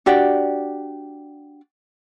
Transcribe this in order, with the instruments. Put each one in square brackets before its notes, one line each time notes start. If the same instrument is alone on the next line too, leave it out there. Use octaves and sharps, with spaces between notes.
[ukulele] D4 F#4 G4 D5